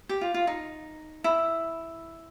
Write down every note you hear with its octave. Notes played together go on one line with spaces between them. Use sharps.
G4
F4
F4
D#4
E4